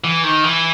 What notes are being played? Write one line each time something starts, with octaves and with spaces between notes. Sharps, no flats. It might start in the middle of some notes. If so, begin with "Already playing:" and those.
E3
D#3
E3